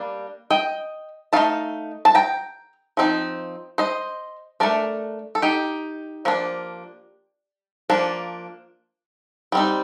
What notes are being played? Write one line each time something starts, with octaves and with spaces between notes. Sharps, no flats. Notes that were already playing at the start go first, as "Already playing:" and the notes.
Already playing: G3 A#3 D4
D#5 G5
A3 D#4 F5 A5
A5
G5 A#5
F3 C4 D#4
C5 D#5
A3 D4 A#4 D5
A4
D#4 G4
F3 A#3 D4
F3 A#3 D4
G3 C4 D#4